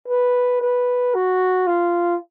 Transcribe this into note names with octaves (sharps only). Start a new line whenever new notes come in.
B4
B4
F#4
F4